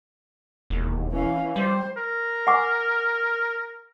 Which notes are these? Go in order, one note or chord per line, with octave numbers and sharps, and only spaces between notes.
E1 D#2
E3 C#4 F5
G3 C5
A#4
F#5 G#5 D6